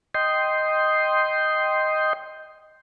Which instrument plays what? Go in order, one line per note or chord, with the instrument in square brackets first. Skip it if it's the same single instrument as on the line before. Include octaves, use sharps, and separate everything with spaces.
[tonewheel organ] D#5 G5 C6